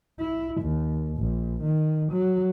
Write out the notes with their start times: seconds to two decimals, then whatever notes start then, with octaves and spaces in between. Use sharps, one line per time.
0.20 E4
0.62 D#2
1.18 A#1
1.62 D#3
2.12 F#3